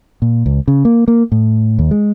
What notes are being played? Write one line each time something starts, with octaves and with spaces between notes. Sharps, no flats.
A#2
C#2
C#3
A#3
A#3
A2
D#2
G#3